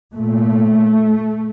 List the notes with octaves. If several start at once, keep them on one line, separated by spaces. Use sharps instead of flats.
A#2 A3